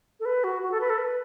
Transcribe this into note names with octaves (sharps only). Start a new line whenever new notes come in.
A4
B4
F#4
F#4
A4
B4
A4
B4